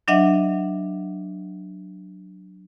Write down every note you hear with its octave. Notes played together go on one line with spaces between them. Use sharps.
F#3 D4 D#5 E5 F#5